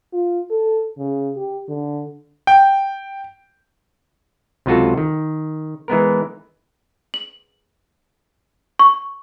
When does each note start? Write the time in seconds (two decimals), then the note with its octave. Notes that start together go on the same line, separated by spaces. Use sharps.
0.13 F4
0.51 A4
0.98 C#3
1.37 G4
1.68 D3
2.47 G5
4.66 C#2 C3 F#3 F4 F#4 A4
4.98 D#3
5.88 E3 G#3 B3 A#4
7.14 F#7
8.79 C#6